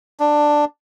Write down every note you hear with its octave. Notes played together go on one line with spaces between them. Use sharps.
D4